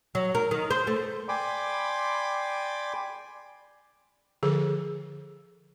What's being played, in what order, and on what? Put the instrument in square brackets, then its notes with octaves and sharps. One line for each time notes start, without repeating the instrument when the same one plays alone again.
[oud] F#3
A#4
D#3
C5
A3
[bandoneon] D5 G5 G#5 B5 C6 D6
[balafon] D3 F3 G#4 A4